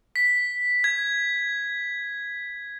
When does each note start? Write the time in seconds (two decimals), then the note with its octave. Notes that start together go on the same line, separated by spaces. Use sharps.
0.16 B6
0.84 G#6